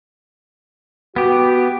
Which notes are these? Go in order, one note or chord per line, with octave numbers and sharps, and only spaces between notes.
B3 F#4 G4